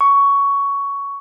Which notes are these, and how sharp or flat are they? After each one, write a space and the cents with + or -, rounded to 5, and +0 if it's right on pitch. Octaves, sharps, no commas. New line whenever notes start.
C#6 +15